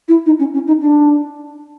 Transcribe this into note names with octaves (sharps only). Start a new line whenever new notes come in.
E4
D#4
C#4
C#4
D#4
D4